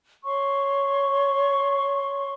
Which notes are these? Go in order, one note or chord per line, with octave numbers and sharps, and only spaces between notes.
C#5 C6 C#6